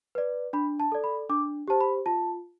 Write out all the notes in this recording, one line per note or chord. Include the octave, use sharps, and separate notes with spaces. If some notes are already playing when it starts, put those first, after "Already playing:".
B4 D5
D4 B5
A5
A4 D5
B5
D4 D6
G4 C5 A5
B5
F4 A5